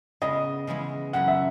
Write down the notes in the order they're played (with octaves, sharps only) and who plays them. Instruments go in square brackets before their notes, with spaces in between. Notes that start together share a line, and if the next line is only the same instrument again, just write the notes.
[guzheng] C#3 G#3 B3 [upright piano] D#5
[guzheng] C#3 E3 G#3 B3
[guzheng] F#2 C#3 E3 [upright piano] F#5
[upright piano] E5